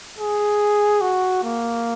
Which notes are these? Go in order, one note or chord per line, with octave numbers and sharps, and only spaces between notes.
G#4
F#4
A#3